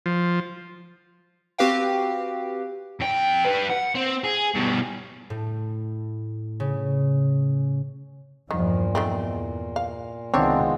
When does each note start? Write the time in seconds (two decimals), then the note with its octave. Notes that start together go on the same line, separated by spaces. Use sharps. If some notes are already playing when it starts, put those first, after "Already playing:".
0.06 F3
1.58 C4 F#4 G4 B4 F5 G5
3.00 F2 G5
3.45 G3 B4
3.70 F#5
3.95 C4
4.24 G#4
4.54 G2 B2
5.30 A2
6.60 C#3
8.51 E2 G2 A#2 D#3 F3
8.95 E2 D#3 A3 C4
9.76 F5
10.34 C2 D#3 G#3 B3 C4 D4 F4 C#5